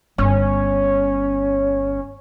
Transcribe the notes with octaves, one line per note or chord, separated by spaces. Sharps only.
G1 C#4